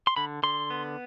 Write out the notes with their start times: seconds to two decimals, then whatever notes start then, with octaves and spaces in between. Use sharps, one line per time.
0.07 C6
0.16 D3 B5
0.43 D3 C6
0.70 B3